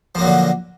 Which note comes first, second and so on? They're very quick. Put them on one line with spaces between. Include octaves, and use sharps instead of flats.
F3 A#3 F#3 A#2 D3